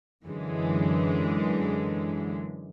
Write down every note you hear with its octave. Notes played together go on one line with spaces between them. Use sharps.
F#2 D3 E3 G#3